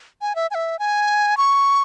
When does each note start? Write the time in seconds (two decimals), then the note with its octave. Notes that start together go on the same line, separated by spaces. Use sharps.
0.21 G#5
0.35 E5
0.51 G#5
0.55 E5
0.79 G#5
1.37 C#6